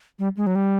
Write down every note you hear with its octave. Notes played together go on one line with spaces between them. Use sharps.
G3
G#3
F#3
G3